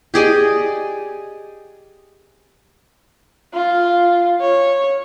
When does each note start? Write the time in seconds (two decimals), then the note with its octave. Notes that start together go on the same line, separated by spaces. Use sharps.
0.14 G4 G#4 D5 D#5
3.54 F4
4.40 C#5